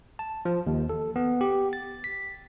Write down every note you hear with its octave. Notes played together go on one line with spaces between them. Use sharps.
A5
F3
D#2
A4
B3
G4
A6
B6